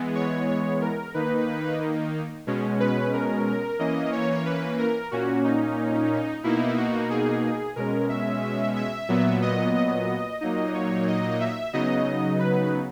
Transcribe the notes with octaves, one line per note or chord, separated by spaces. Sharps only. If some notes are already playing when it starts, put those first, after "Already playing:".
Already playing: E3 G#3 B3
C#5
C#5
A#4
D#3 A#3 D#4 B4
B2 G#3 C#4
B4
A#4
A#4
E3 A#3 C#4 D#5
C#5
B4
A#4
A#2 A#3 C#4 F#4
D#4
B2 A#3 D#4 E4
F#4
G#4
B2 G#3 C#4 A#4
E5
E5
A#2 F#3 B3
D#5
D#5
A#2 F#3 A#3 D#4 D#5
C#5
D#5
E5
C#3 F#3 B3 D#4 D#5
B4